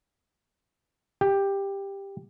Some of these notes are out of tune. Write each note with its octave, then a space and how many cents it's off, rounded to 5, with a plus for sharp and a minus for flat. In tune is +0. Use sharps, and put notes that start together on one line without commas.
G4 +10